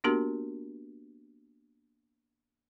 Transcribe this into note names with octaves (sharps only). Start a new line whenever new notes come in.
A#3 B3 D4 F#4 G4 A#4